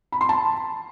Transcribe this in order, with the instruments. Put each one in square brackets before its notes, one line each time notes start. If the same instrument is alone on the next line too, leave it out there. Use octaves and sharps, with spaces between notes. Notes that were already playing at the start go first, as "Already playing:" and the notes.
[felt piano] B5
C6
A5